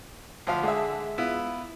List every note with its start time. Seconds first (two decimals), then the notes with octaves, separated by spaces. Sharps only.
0.47 D2 F3 F5
0.63 D3 G#3 G#4 E5
1.18 B3 E4 F4